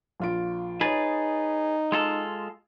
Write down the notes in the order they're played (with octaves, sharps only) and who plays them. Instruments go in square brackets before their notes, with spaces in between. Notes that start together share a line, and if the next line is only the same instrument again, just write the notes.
[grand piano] A#1 F4 D7
[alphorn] D#4 [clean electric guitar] G#4 B4 [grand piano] C#5 A6
[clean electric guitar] G#3 F4 A4